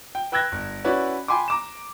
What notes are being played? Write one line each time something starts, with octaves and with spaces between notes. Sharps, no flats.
G5
B4 G5 E6 F#6 G#6 A#6
G1
C#4 E4 F#4 B4 C#5 D5
F4 G5 G#5 B5 C6 D6
A#5 D6 E7